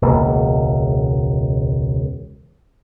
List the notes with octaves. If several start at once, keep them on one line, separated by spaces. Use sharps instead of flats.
E1 C#2 A#3